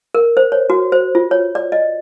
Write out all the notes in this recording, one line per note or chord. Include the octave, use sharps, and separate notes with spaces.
A#4
C5
C#5
F#4
C5
F4
C#5
D5
D#5